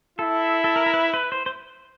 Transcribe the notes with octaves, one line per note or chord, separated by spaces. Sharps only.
E4 A4
A4
A#4
A#4
B4
B4
C5
C5